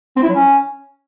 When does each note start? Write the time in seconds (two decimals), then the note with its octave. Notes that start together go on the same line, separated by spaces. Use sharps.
0.16 C4
0.23 E4
0.29 F#3
0.35 C#4